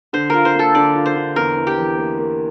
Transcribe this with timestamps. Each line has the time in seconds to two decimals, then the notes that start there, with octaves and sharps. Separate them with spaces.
0.13 D3 C5
0.30 F4 A#4
0.45 C5
0.55 A#3 A4
0.75 D3 D5
0.95 F4
1.06 C5
1.16 D3
1.36 E2 A#4
1.57 E3
1.67 G4
1.78 E3
1.98 A#3
2.18 A#3